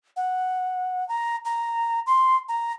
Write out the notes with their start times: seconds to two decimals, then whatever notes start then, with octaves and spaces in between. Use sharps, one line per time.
0.17 F#5
1.09 A#5
1.45 A#5
2.07 C6
2.49 A#5